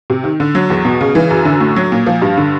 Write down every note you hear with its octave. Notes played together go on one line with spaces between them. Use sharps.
C3
D#3
D3
F#3
E2
B2
C#3
E3
F#2
D3
A2
F#3
A#2
F3
G2
D3